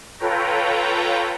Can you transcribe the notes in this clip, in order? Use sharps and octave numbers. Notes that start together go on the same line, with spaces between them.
F4 A4 B4 C#5 G5 A#5